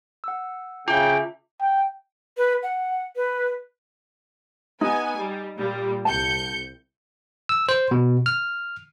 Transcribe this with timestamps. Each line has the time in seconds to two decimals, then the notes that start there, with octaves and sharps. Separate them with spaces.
0.24 F#5 E6
0.88 C#3 F4 E5 G5 D6
1.61 G5
2.38 B4
2.63 F#5
3.16 B4
4.81 B3 D#4 G#5
5.18 G3
5.58 A#2 G3
6.05 C2 A5 G6 C#7
7.49 E6
7.69 C5
7.91 B2
8.26 F6